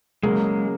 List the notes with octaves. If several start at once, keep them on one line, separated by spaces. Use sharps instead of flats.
C#3 F#3 G#3 A#3